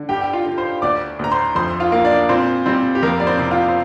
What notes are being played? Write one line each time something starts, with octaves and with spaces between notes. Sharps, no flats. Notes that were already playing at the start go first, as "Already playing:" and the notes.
Already playing: D3
G2 G4 G5
G5
F4 F5
D3
C5 C6
D2 D5 D6
D2 A#5
C5 C6
F2 C5 C6
F4 F5
A#3
D4 D5
A#2 C4 C5
G3 C4 C5
G4
F2 A#3 A#4
D5
C4 C5
C3
F4 F5
C5